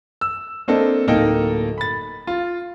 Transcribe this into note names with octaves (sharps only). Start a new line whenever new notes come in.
E6
A#3 C4 D4 A4 D#5
D1 A#3 D#4 A4 G5
B5 A6
F4